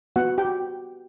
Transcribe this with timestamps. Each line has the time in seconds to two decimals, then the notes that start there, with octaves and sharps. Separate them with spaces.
0.16 B3 F#4 F#5
0.38 G4 G5
0.45 F#4